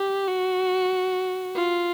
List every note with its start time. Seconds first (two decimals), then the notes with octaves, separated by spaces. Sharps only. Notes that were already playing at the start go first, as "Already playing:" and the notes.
Already playing: G4
0.28 F#4
1.55 F4